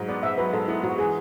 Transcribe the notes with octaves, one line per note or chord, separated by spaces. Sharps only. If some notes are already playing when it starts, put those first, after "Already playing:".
Already playing: G#2 F#3
B3 D5
G#2 E5
F#3 B4
G#2 A4
B3 E4
G#2 F#4
E3 G#4